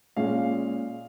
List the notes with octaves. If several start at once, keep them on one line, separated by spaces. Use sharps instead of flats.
A#2 G#3 C#4 F5